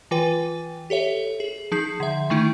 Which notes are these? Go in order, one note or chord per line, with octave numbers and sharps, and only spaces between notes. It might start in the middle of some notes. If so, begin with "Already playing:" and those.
E3 F4 B4 G5
G4 A4 C#5 E5
G#4
F3 D#4 G#4 G6 C7
D3 E5
D#3 A3 D#4 E4